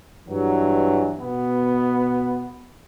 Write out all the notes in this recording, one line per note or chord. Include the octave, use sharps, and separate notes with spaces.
G2 E3 F#3
B2 B3